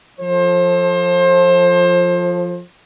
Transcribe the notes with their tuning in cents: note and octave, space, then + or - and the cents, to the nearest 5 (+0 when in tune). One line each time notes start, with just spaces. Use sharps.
F3 +5 A4 +0 C5 +30